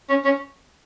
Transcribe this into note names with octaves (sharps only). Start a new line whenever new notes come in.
C#4
C#4